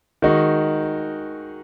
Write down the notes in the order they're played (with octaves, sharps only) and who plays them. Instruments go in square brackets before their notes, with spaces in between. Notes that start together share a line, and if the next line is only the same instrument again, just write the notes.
[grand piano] D#3 G#3 D#4 F#4